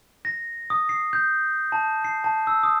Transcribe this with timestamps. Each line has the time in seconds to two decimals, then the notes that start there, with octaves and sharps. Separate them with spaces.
0.25 A#6
0.70 D#6
0.89 C7
1.13 G6
1.72 A5
2.04 C7
2.24 A5
2.47 E6
2.63 D#6